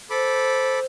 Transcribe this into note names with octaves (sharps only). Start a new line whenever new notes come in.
A4 C5 B5 D6